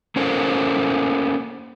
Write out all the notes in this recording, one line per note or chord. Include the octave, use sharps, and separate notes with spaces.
A#3 C#4 A4 A#4 C5